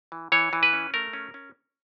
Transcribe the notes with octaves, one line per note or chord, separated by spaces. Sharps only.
E3
E3 C#5
E3
B4
C#4
A3 A#4
C#4
C#4